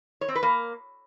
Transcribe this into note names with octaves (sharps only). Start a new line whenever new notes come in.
C#5
C4
B4
A#3